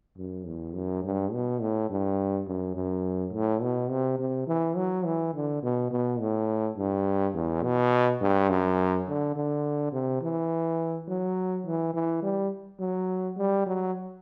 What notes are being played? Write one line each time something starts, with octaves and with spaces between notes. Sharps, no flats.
F#2
E2
F#2
G2
B2
A2
G2
F#2
F#2
A2
B2
C3
C3
E3
F#3
E3
D3
B2
B2
A2
G2
E2
B2
G2
F#2
D3
D3
C3
E3
F#3
E3
E3
G3
F#3
G3
F#3